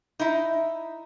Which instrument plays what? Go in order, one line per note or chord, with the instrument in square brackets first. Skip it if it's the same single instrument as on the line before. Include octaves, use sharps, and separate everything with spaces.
[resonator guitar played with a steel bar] D#4 E4